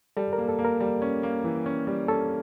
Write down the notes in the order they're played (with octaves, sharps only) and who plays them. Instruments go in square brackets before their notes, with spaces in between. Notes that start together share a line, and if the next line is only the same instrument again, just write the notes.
[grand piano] G3 [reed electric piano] A4
[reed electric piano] A#4
[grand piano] A#3
[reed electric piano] A4
[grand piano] A#3
[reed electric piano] A#4
[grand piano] G3
C#4
A#3
E3
C#4
G3
[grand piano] C#4 [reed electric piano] A4